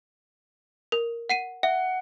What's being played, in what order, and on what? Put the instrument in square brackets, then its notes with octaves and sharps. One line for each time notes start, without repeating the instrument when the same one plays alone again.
[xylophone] A#4
F#5 C7 D#7
[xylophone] E5 [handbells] F#5